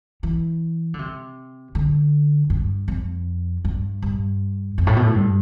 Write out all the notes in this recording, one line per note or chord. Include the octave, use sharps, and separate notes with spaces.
E3
D3
C3
D3
G2
F2
G2
G2
F2
A2
B2
A2
G2